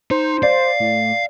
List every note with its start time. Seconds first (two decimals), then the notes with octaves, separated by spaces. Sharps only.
0.11 D#4 C5
0.43 D5 F5
0.80 A2